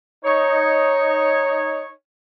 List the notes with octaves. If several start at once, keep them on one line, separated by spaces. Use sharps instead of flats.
D#4 C#5